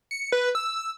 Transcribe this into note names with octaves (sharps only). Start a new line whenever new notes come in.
C#7
B4
E6